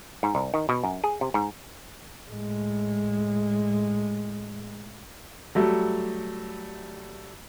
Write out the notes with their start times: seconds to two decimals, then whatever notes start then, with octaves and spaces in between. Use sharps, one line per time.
0.23 G#2
0.35 C2
0.54 D#3
0.69 B2
0.84 F#2
1.04 G#4
1.21 C3
1.34 G#2
2.27 A2 G#3
5.55 F#3 G3 A3